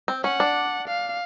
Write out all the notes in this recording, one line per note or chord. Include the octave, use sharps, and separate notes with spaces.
C4
C#4 F#5
D4
F5